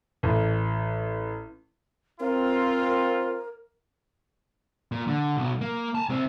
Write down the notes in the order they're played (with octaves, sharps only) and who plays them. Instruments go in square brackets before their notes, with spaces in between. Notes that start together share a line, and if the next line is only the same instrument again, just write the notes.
[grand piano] A1
[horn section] C4 F4 [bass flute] A#4
[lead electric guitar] A#2
D3
B1 B2
A#3
G#5 A5
C2 C4